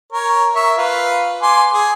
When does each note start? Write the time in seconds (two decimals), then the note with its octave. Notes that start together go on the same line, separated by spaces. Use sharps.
0.13 A#4 C#5
0.55 A#4 E5 C#6
0.78 F4 B4
1.42 G#5 C6 D6
1.73 G#4